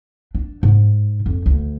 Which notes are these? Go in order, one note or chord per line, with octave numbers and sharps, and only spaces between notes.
D4
G#2
F2
D2